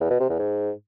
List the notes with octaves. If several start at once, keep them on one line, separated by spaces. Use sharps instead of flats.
E2
B2
C3
E2
G#2